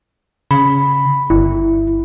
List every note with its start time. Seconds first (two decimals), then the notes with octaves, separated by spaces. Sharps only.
0.51 C#3 B5
1.30 G1 E4